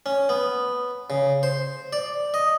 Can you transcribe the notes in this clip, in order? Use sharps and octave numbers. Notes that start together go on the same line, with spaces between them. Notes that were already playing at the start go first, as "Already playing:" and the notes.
C#4
B3
C#3
C5
D5
D#5